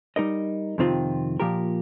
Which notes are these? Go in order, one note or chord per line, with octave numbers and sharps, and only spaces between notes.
G3 D#4 A#4 D#5
F2 C3 D#3 C4 F4
A#2 F3 A#3 G4 A#4